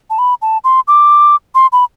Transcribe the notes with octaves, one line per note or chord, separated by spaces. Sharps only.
A5
B5
A5
C6
D6
C6
B5